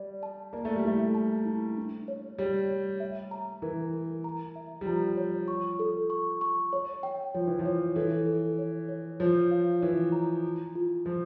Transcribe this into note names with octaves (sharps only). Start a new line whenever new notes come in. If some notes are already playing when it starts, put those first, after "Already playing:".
Already playing: G3 D5
A5
A#3 D5
A3
G3
A3 E4
A5
E4
D4
C#5
G3 C#5
C#5
E5
A#5
E3 A#4
A#4
A#5
E5
G3
F3 A#5
C#5
C#6
A4
C#6
C#6
C#5
G5
F3 C#5
E3
F3
C#5
E3 A4
A4
C#5
C#5
F3 C#5
F5
E3 C#5
A#5
F4
F4
F3 F4